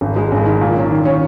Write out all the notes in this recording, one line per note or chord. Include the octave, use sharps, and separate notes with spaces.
G#1
G#3
G#1
D#3
A#2
C#4
D#3
C#4